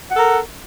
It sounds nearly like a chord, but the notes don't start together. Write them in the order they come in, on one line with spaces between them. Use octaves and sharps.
F#5 A4 A#4